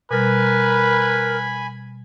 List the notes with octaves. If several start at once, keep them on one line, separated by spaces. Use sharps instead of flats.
B2 G3 A#4 B4 G#5 B5